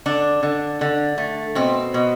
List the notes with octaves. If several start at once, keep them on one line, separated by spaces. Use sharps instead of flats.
D3 D4
D3
D3
A3
B2 C4
B2